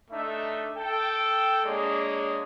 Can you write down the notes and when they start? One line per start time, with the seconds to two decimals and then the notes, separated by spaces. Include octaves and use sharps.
0.11 A3 D4 D#4 E5
0.74 A4 G5
1.65 G#3 A#3 D4 G#4 C#5 D5